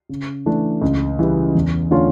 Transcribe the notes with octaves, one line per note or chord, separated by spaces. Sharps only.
C#3
E3 A3 D4
C#2
C#3 E3 G3
E2
D3 A3 C#4 F4